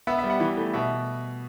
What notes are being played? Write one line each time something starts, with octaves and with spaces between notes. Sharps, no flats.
B3 E5
E5
G3
F#5
E3
A3
B2 E5